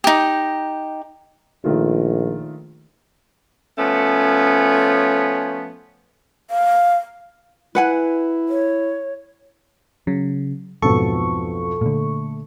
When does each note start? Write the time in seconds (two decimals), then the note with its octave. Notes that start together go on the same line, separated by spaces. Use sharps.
0.04 D#4 G4
1.64 A#1 D#3 A3 F4
3.78 F3 A3 B3 C#4
6.50 F5
7.75 E4 B4 F#5 G#5
8.49 C#5
10.07 C#3 F#3
10.82 B1 F2 G#2 B2 A4 C#6
11.81 A#2 D3 A3